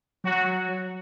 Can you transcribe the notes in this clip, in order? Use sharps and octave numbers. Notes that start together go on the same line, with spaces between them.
F#3 F#4